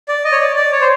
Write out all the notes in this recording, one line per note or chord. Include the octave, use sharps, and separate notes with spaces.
D5
D#5
C#5
D5
D5
C#5
C5